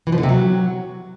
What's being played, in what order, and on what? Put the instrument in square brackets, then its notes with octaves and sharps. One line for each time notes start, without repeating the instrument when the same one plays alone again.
[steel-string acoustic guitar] E3
F3
D3
C3
F#3